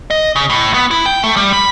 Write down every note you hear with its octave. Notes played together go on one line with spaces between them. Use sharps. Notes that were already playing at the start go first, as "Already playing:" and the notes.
D#5
C#3
A2
B3
E4
G5
A3
G3
B5